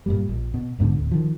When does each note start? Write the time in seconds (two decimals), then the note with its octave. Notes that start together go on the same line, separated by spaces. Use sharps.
0.06 G2 A#2 G3
0.29 A#1
0.54 B2
0.79 A#1 G#2 B2 D3
0.96 D1
1.11 D#3 F3